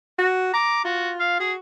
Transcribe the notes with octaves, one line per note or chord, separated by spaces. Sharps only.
F#4
A#5 D6
F4 F#4
F5
F#4 G#4